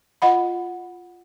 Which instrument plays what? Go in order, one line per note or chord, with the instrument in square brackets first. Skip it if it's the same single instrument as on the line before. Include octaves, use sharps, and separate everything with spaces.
[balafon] F4 D#5 F#5 B5